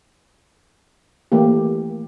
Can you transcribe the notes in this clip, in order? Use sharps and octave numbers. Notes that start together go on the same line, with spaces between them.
E3 A3 A#3 G4